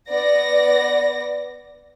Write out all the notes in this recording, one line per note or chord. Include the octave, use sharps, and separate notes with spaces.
B3 D5 A#6